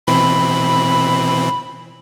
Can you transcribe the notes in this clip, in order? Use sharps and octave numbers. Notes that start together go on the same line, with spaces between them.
B2 E3 C4 B5